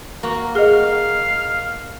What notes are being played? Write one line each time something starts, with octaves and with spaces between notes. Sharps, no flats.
A#3 F#4
G#4 D#5 F5